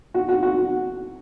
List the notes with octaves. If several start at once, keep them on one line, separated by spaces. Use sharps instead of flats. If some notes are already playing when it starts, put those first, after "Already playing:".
F#4
F#4
F#4